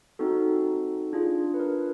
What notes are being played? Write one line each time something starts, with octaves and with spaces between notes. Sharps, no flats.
C4 D#4 F#4 A4
D4 F4 G#4
B4
A#4